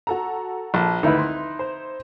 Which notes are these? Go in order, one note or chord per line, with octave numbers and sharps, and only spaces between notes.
F#4 A4 A#5
A#1 A5
G#1 D2 A3 D#4 E4 B4
C6
C5